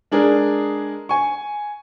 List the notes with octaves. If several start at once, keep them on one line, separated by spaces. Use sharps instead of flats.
G#3 D4 G#4 A#4
G#5 C#6